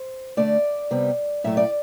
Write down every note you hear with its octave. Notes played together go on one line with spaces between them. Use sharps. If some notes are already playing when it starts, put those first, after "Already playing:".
Already playing: C5
D3 A3 D5
C3 G3 B3
A2 F#3 A3 E5
D5